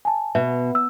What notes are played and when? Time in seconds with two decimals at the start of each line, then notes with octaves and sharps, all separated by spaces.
0.05 G#5 A5
0.35 B2 E5
0.75 E6